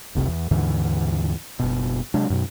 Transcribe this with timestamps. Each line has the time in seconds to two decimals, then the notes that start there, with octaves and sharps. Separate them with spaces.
0.15 F1 C2 C3
0.26 E2
0.51 D#2 G#2 D3 E3
1.59 F#1 B2
2.14 C3 F#3 G#3 D4
2.30 F#2 B2